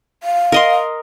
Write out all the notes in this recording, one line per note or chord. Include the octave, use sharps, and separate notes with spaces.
F5
A#4 D#5 C6